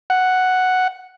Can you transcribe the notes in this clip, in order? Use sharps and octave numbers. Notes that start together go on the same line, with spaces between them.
F#5